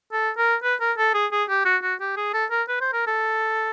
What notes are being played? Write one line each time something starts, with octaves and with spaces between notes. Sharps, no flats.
A4
A#4
B4
A#4
A4
G#4
G#4
G4
F#4
F#4
G4
G#4
A4
A#4
B4
C5
A#4
A4